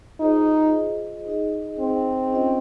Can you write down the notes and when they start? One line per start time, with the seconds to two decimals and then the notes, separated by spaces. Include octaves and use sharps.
0.20 D#4 F4 G#4 C5 D#5
1.26 D#4 G#4 D#5
1.79 C4
2.32 C#4 F4 C5 D#5